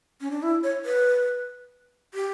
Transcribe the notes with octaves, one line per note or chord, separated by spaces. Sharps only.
C#4
D4
E4
C#5
B4
G4